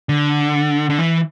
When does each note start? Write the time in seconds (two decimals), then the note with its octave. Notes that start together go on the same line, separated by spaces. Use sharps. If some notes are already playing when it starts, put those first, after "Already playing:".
0.09 D3
0.90 D3
0.99 E3